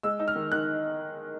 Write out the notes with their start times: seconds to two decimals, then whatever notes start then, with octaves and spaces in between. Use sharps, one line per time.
0.03 G#3 E6
0.19 D#4
0.28 F6
0.36 D#3
0.52 D#3 F#6